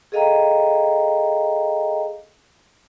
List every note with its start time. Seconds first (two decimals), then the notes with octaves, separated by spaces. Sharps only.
0.12 G#4 A4 D#5 F5 G5 A#5